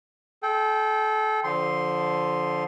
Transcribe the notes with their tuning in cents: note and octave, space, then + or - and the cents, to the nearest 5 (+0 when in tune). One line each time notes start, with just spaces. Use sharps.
A4 -30 G5 +0
D3 -15 F3 +0 C6 +0